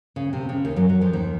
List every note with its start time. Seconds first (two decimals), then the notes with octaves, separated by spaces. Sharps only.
0.16 C#3
0.33 C3
0.49 C#3
0.65 D#2 D#3
0.76 F#2 F#3
0.89 F#2 F#3
1.01 F2 F3
1.13 D#2 D#3